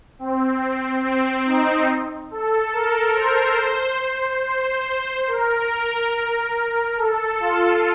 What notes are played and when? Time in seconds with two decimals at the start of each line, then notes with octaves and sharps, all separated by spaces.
0.19 C4
1.04 C4
1.46 D#4
2.31 A4
2.73 A#4
3.15 C5
4.43 C5
5.27 A#4
6.97 A4
7.40 F4